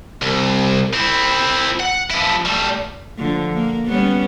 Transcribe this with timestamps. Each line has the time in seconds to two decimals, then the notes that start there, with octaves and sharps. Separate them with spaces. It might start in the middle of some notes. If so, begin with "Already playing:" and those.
0.22 C2
0.94 C4 E4
1.80 F#5
2.11 F3 E4
2.45 G3 A3
3.18 D3 F3
3.53 A#3
3.88 G3 B3 C#4